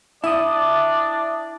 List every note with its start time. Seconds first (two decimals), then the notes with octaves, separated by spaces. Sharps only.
0.24 D4 E4 D5 E5 D#6